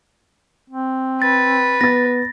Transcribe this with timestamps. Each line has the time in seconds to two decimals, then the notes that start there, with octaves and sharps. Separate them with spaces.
0.70 C4
1.22 B4 A6
1.81 B3 A6 A#6